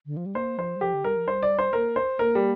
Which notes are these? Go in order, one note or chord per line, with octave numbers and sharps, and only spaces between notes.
D3
F3
G3
A#3 C5
F3 C5
G3
F3 G4
D3
G3 A#4
F3
G3 C5
D5
C5
A#3 A#4
C5
A#3 A#4
G3